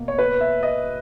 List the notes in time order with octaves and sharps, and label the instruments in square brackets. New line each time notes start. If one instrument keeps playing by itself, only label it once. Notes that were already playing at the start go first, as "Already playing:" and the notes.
Already playing: [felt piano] B2 A#3
[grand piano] C#5
B4
E5
D#5